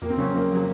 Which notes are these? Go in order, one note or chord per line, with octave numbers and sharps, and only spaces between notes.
F2 A#3
C4
C#3 F#3 C#4
F2 A#3
C#3 F#3